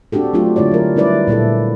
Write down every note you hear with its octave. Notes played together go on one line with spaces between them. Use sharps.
C4 D4 F#4 G4 A4
F#3 A3 D4 F4 G4
D3 G#3 E4 C#5 D5
F#3 A#4
G3 C#4 E4 B4 D5
A#2 A#3 E4 A4